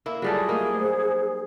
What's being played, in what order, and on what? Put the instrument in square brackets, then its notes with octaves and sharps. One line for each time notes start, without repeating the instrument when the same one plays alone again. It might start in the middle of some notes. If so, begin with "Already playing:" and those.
[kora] A#3 E4
[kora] F#3 G3 A3 [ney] F4 [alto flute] G#4
[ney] A3 [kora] A#3 D#4
[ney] C5